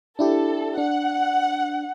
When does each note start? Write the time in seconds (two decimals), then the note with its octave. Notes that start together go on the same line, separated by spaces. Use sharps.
0.19 D4 E4 G4 A4
0.78 D4 F#5